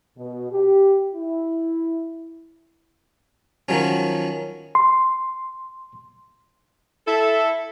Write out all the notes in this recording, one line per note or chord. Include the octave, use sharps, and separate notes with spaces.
B2
G4
E4
D#3 F3 F#3 C#4
C6
E4 A4